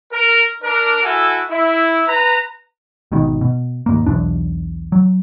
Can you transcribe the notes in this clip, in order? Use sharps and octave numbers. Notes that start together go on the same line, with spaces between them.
A#4
D4 A#4
E4 F#4 A4 G#5
E4
B4 A#5
G#1 G#2 B2 D#3
B2
D#2 G#2 A#3
B1 E2 D4
F#3